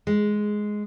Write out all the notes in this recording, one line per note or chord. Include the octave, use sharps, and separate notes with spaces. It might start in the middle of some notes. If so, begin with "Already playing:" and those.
G#3